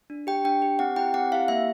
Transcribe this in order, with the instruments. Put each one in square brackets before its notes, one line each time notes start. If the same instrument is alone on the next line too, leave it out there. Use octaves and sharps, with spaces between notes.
[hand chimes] D4
G4 G5
D4 G5
G4
C4 F#5
E4 G4 G5
C4 F#5
E4 G4 F5
A#3 E5